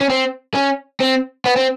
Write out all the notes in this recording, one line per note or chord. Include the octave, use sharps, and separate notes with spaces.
C#4
C4
C#4
C4
B3
C4